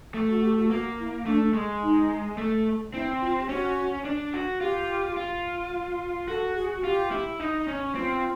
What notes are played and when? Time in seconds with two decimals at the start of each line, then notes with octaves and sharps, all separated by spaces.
0.14 A3
0.28 F#4
0.43 G4
0.56 F#4
0.70 A#3 F#4
0.98 E4
1.26 A3 D4
1.54 G#3
1.82 D#4
2.38 A3
2.93 C4 E4
3.21 F4
3.40 G4
3.49 C#4 F#4
4.05 D4
4.33 F#4
4.61 F4 G4
5.17 F4
6.28 F#4 A4
6.55 G#4
6.83 F4 G4
7.11 E4
7.40 D#4
7.68 C#4
7.95 C4 F4